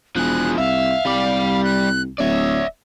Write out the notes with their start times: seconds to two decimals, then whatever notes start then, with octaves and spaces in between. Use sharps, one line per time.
0.16 E1 F3 G#4 F#6
0.58 C2 E5 F5
1.06 C2 G3 D5
1.64 F#6
2.19 D1 C#5 D5 E5